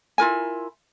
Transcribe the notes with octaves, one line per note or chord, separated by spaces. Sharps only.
E4 F4 A#4 G#5